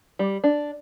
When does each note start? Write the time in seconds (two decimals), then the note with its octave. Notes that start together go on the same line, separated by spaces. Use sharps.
0.19 G3
0.44 D4